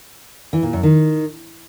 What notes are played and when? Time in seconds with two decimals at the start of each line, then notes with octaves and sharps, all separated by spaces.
0.53 E3
0.63 A#2
0.73 F#2
0.83 D#3